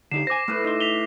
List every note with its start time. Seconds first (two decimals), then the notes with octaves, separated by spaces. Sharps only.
0.11 D3 D#4 G4 C7 E7
0.27 C5 G#5 D6 A#6
0.48 A2 A3 B4
0.65 D#4 C6 A#6
0.81 B6 F7 G7